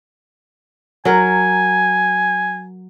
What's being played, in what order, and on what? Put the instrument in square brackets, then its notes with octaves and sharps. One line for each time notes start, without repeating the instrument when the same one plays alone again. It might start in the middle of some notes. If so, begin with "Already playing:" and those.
[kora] F#3 A#4 [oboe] G#5